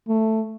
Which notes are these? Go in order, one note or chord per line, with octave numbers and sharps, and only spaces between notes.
A3